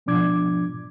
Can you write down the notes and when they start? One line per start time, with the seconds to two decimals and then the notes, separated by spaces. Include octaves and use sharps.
0.06 G#2 B2 F3 D4 D6 G#6